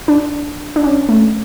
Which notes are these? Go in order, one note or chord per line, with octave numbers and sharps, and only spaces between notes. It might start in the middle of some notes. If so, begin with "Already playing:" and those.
D4
D4
C#4
A3